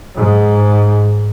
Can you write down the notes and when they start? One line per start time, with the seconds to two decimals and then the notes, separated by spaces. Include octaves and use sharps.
0.16 G#2